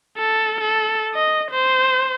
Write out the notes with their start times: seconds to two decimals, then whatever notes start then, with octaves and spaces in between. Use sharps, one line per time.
0.18 A4
0.61 A4
1.14 D#5
1.51 C5